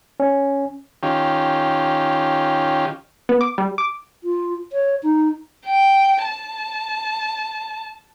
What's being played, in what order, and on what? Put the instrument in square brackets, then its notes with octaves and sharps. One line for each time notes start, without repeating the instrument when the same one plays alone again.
[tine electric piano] C#4
[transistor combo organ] D#3 C#4 F4 G4
[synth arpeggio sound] B3
D6
G3
D6
[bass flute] F4
C#5
D#4
[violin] G5
A5